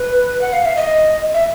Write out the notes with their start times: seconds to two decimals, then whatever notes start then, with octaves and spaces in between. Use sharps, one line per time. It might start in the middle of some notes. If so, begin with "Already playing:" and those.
Already playing: B4
0.41 F#5
0.53 F5
0.65 E5
0.77 D#5
1.34 E5